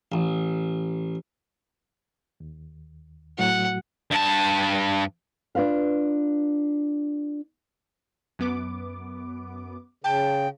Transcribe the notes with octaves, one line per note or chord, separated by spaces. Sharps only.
A1
D#2
A2 F#3 F#4 F#5
G2 A5
D4 F4 B4 F5
F#2 B3 D6
C#3 G5 A5